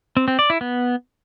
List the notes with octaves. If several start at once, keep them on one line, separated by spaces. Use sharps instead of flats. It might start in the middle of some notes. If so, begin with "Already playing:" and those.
C4
C4
D5
E4
B3